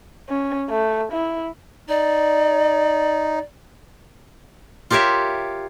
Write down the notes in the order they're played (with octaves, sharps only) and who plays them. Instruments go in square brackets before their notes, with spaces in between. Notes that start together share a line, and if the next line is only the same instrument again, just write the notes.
[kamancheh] C#4
A3
E4
[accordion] D#4 [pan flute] D5
[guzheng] F4 G4 A#4 C#5 E5